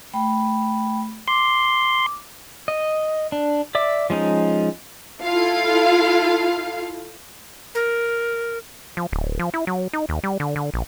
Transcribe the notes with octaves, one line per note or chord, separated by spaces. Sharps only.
A3 G5 B5
C6 D6
D#5
D4
D5 E5 D6
F3 G#3 C#4 D#4
E4 F4 A4 F5
A#4
F3
D1
F3
E4
F#3
D#4
D#2
G3
D3
D3
A#1